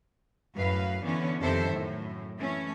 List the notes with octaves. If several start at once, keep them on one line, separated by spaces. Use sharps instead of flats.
F#2 A2 B4 F5
D3 E3 B3 C#4
F2 C3 D#3 A4 C5 E5
F#2 A2
E3 A3 C#4